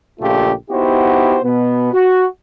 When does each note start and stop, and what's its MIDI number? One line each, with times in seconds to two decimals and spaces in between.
0.20 0.51 34
0.20 0.51 46
0.20 0.51 49
0.20 0.51 57
0.20 0.51 65
0.20 0.51 67
0.70 1.38 59
0.70 1.38 63
0.70 1.38 64
0.70 1.38 66
0.70 1.38 67
0.70 1.38 72
1.44 1.90 47
1.44 1.90 59
1.93 2.26 66